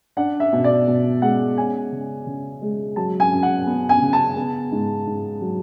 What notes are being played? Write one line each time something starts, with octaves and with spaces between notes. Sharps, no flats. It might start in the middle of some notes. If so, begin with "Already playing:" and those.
D4 F#5
E5
B2
D5
B2
G#3 F#5
C#4 G#5
C#3
C#3
G#3
F#3 A5
G#5
F#2
F#5
B3
G#5
C#3
A5
B3
G#2
G#2
F#3